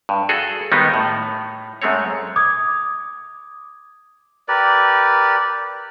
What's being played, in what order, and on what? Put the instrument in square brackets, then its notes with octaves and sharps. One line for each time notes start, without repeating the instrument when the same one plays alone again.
[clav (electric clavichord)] G2
F#4 G#4 A4
D#2 D#3 G3 G#3 B3 D#4
A2
F#2 G#3 A3 C4 C#5
[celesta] D6 D#6 G#6
[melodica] G4 A#4 B4 D5